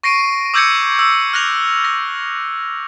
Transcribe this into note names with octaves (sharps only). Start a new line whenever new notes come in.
C#6 A#6 C7 D7 D#7
D6 E6 G6 G#6 A#6 C#7
E6
F6 F#6 A#6 F7
A#6